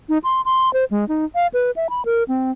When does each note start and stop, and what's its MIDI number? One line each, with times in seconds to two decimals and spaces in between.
0.09 0.18 63
0.24 0.41 84
0.45 0.72 84
0.74 0.85 72
0.91 1.07 56
1.08 1.25 63
1.35 1.47 77
1.54 1.71 71
1.76 1.88 76
1.90 2.05 83
2.05 2.24 70
2.28 2.51 60